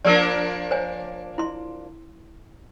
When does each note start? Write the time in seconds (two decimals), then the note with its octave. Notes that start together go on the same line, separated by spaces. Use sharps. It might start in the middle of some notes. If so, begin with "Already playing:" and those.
0.05 F3 A#3 D4 A#4 D5
0.71 C5 C#5 G#5
1.38 E4 C6